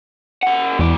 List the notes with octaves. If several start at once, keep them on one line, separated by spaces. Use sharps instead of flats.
C#3 F#5
E2 G#3 D5